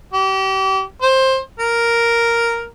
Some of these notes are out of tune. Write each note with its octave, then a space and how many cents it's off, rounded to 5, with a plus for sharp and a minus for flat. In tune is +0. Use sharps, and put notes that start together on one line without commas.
G4 -35
C5 +15
A#4 +0